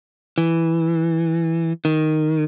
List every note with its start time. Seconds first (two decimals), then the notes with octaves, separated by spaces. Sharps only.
0.38 E3
1.85 D#3